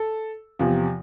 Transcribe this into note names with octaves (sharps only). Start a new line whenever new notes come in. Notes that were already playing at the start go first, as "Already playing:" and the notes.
Already playing: A4
E2 C3 F3